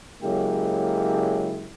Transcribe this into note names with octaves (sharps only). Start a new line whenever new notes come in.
C#3 F#3 G#3 A#3 E4 G4